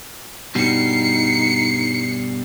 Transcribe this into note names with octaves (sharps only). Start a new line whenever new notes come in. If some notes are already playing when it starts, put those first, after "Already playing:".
G2 B2 G3 D#4 C7 C#7